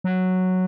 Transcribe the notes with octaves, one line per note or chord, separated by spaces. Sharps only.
F#3